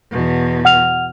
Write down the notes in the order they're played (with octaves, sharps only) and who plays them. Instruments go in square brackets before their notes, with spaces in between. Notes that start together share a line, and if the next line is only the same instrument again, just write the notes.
[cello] E2 B2
[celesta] F#5 F6 F7